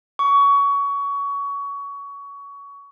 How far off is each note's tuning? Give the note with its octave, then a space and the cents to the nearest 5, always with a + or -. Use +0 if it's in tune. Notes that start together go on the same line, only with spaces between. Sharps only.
C#6 +25